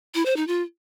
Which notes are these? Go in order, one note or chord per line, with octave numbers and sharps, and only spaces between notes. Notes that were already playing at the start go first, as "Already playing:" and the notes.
E4
C5
D#4
F4